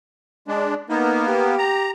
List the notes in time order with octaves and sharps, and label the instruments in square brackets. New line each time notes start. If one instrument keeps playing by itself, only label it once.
[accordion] G#3 D4
[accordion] A#3 B3 [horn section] D#4
[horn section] G4
[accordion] A#5